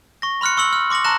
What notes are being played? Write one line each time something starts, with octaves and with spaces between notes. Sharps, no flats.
C#6 A#6
B5 C6 F6 F#6 C#7
C#6 E6 C#7 F#7
F6
C6 D6 A#6 C#7 F#7
A5 A#5 C#6 F#6 A#6 E7